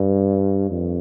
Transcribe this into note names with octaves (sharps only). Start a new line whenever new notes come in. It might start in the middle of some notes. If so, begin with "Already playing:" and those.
Already playing: G2
F2